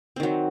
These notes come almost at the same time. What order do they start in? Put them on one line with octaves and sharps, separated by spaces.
C4 D#3 F#3